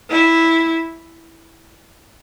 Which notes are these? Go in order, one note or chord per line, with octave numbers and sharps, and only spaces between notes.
E4